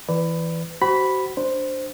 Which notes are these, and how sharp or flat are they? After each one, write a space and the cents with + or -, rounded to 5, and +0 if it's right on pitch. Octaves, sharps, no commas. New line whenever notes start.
E3 +0 B4 +15 D5 +0
F#4 +35 C5 -10 B5 +0
D4 +0 C5 +0